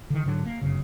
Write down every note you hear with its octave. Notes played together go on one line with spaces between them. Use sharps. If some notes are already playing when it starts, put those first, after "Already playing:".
D3 D#3
G#2 D3 F#3 D4
A#3
G1 F#2 C#3